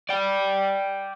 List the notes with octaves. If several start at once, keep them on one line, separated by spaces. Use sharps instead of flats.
D5 G5